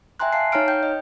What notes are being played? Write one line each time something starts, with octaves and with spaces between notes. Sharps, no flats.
E5 G5 G#5 A#5 C6 F#6
F5 A5 C7
D#4 C#5 F5 A#5 F6 D7
G5 G6
D#5